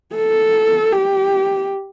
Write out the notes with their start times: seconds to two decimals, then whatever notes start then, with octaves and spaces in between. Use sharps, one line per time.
0.16 A4
0.92 G4